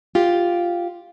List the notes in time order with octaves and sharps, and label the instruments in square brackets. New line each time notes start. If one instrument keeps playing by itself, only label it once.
[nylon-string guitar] F4 G4